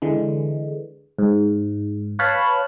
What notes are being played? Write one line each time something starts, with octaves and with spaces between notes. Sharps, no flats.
D3 E3 G#3
G#2
B4 C#5 F5 A5 B5